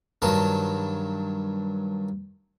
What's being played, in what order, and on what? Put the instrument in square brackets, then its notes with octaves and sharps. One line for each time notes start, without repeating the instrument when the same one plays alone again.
[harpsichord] G2 D#3 F#3 A5